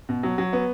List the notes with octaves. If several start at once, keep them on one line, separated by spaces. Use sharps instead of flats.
B2
F#3
F#3
B3